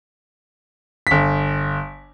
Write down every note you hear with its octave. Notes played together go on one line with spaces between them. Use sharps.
G1 B6